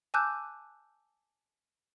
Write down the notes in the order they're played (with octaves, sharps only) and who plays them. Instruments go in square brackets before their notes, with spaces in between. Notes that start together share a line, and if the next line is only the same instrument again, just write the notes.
[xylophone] G#5 A5 D6 E6 F#6 G6